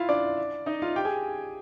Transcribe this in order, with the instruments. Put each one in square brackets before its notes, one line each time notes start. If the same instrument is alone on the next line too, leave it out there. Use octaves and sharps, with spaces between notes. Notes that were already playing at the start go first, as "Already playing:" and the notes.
Already playing: [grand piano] E4 F4 E5 F5
D4 D5
D#4 D#5
F4 F5
G4 G5
G#4 G#5